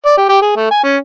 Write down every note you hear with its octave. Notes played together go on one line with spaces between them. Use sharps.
D5
G4
G4
G#4
A3
G#5
C#4